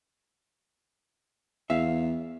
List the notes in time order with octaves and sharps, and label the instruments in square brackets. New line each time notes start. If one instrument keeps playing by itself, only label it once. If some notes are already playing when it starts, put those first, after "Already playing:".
[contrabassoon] E2 [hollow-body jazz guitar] E5 F5